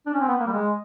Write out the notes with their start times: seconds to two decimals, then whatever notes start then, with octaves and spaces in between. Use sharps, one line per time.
0.07 D4
0.14 C#4
0.21 C4
0.28 B3
0.40 A#3
0.47 G3
0.52 G#3